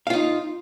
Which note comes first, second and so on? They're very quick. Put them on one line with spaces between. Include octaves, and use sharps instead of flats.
F5 F4 D#4